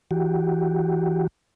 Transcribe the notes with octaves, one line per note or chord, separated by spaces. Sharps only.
E3 F#4 G4